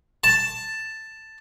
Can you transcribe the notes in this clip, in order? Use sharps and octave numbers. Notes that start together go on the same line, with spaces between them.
A5